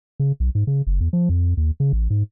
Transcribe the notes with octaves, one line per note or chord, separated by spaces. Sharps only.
C#3
B1
G#2
C#3
F#1
E2
F3
F2
D#2
C#3
A1
G#2